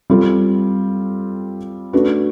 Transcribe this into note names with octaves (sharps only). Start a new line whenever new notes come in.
G3 C4 F4 A4
A3 D4 F#4 B4